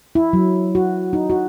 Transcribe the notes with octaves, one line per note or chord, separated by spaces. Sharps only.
E4
F#3
F#4
D#4
F#4